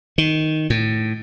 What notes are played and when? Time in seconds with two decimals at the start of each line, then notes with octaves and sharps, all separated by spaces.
0.18 D#3
0.70 A2